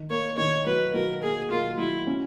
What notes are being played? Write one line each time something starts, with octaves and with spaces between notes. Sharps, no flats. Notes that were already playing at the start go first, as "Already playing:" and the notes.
Already playing: D#3
A#3 C#5
D#3 C#5
F#3 B4
F#3 A#4
A#3 G#4
A#3 F4
F#3 E4
C#4